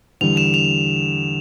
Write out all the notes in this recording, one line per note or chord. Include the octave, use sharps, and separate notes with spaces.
E2 D3 G3 F7
E7
F7